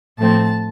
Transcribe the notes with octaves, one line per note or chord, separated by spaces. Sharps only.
A2 F3 A3 C4 A5